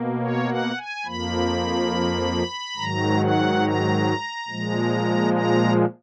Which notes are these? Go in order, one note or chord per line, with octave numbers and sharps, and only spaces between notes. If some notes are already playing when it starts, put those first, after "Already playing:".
Already playing: B2 A#3
C#5
F#5
G#5
F2 F3 A#3 B5
G#2 D#3 F#3 A#5
F#5
A#5
A#2 F3 G#3
A#5